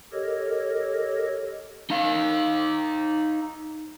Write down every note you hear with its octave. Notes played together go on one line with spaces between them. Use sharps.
G4 A4 A#4 C#5 D#5
D#4 F5